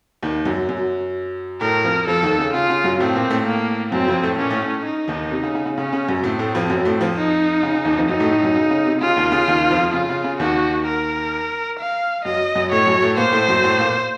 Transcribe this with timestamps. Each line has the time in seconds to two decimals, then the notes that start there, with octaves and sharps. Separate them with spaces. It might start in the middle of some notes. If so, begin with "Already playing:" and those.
0.23 D#2 D#3
0.45 F#2 F#3
0.69 F#2 F#3
1.61 A2 A3 A#4
1.84 F2 F3
2.07 F2 F3 A4
2.23 D#2 D#3
2.39 C#3
2.53 C#3 F4
2.70 C#3
2.84 F#2 F#3
3.00 A2 A3 C4
3.16 A#2 A#3
3.30 A2 A3
3.46 A#3
3.92 F#2 F#3 C4
4.08 F2 F3
4.23 A2 A3
4.38 A#2 A#3 C#4
4.50 A2 A3
4.62 A2 A3
4.85 D#4
5.08 D#2 D#3
5.31 C3
5.43 C#3
5.55 C#3
5.66 C#3
5.77 C#3 C#4
5.93 C#3
6.08 F#2 F#3
6.23 A2 A3 C4
6.39 A2 A3
6.55 F2 F3
6.70 F#2 F#3
6.85 A2 A3
7.00 F2 F3
7.16 D#4
7.63 C#3
7.74 C#3
7.85 D#2 D#3
7.97 F2 F3
8.09 F#2 F#3 D#4
8.20 A2 A3
8.32 A2 A3
8.43 F#2 F#3
8.56 C#3
8.71 C#3
8.86 C3
9.01 C#3 F4
9.16 D#2 D#3
9.32 C#3
9.48 D#2 D#3
9.71 F2 F3
9.93 C#3 F4
10.09 C#3
10.24 C#3
10.40 D#2 D#3 F#4
10.87 A#4
11.79 F5
12.25 F#2 F#3 D#5
12.55 F#2 F#3
12.71 A2 A3 C#5
12.87 F#2 F#3
13.02 A2 A3
13.17 A#2 A#3 C5
13.33 A2 A3
13.48 F#2 F#3
13.64 A2 A3
13.79 A#2 A#3